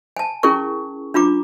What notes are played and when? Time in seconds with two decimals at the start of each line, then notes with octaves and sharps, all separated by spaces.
0.17 G#5 A5
0.43 C#4 E4 G#4 A#4 C#6
1.14 D4 F4 A#5 D6